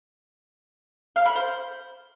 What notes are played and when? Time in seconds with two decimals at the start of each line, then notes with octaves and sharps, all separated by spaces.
1.16 F5
1.26 B5
1.35 C5